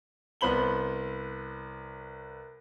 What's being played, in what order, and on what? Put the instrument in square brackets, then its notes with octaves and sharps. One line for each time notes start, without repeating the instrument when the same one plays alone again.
[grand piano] C2 B3 C5 B5 F#7 G7